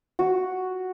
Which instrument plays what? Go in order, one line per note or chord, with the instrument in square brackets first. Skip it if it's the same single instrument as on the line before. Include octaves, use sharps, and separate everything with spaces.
[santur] F#4